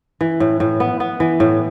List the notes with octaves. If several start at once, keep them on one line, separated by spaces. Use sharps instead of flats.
E3
A2
A2
B3
B3
E3
A2